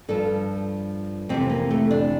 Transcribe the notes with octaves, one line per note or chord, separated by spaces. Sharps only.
G2 F3 A4
F2 C3 E3 C4
A#3
A3
D4